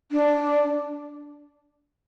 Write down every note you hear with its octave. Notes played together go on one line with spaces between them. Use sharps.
D4